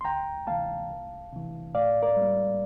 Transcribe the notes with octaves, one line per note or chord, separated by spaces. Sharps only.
C6
D2 G5 A#5
C3 E3 A#3 F5 A5
C2
C3 E3
A2 D5 F5
A#4 D5
G3 A#3